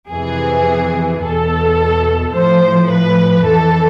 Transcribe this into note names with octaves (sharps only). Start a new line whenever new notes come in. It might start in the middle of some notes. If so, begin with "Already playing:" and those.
F2 C3 E3 G#4
E2 B2 A4
A2 F3 C5
B4
F2 E3 A4